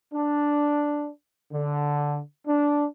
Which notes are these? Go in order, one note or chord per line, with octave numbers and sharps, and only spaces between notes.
D4
D3
D4